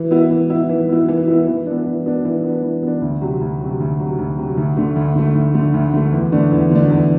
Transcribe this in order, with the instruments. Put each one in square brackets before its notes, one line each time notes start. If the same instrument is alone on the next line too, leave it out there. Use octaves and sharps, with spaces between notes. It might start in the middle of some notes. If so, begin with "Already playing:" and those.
Already playing: [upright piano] E3
B3 E4
E3
B3 E4
E3
B3 E4
E3
B3 E4
E3
B3 D4
E3
B3 D4
E3
B3
D4
E3
B3 D4
D2
C3 F#3
D2
C3 F#3
D2
C3 F#3
D2
C3 F#3
D2
D3 A3
D2
D3 A3
D2
D3 A3
D2
D3 A3
E2
D3 A3 D4
E2
D3 A3 D4
E2